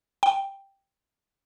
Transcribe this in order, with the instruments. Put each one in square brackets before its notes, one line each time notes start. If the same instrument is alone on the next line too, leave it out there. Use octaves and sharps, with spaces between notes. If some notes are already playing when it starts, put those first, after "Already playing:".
[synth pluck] G5